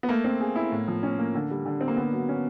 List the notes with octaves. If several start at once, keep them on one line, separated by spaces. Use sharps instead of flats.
B3
A3 A#3
C4
G#4
E4
A2
F3
C#4
A#3
D3
G3
D3
C4
A#3
D3 B3
F#3
C#4